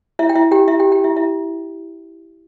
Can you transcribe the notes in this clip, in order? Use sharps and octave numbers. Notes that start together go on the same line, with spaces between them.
E4 E5
G5
E4 E5
G4 G5
E4 E5
G4 G5
G4 G5
E4 E5
E4 E5